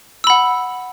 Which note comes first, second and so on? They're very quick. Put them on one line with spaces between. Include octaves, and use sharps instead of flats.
E6 B5 F#5